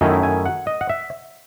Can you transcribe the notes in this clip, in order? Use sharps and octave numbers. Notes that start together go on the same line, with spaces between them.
F#2 D#3 A3 C#4 E4 D#5
G#5
F#5
D#5
F#5
E5